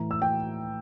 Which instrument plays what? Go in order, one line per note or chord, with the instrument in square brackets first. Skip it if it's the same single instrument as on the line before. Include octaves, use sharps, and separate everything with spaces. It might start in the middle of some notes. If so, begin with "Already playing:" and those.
Already playing: [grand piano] A2 E3 A#5
E6
G5